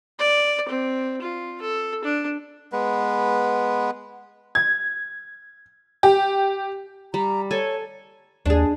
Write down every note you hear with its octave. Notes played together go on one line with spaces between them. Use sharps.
D5
C4
F4
A4
D4
G#3 B3 B4
G#6
G4
G3 A#5
A4 C#5 G#5
D#2 D4 G#4